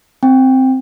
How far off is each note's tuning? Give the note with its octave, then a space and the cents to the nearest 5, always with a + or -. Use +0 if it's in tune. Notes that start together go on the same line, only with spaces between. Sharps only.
C4 +0 G5 +20